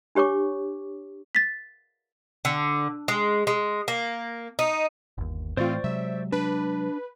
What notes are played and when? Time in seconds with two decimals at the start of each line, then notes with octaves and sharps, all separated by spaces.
0.15 D4 G4 C#5 C#6 D6
1.35 A6 B6
2.45 D3
3.08 G#3
3.47 G#3
3.88 A#3
4.59 D#4
5.18 G1 D#2
5.57 A2 E3 A3 C4 F4 C5 D5 C#6
5.84 C3 F#3 G#3 E5
6.32 D4 B4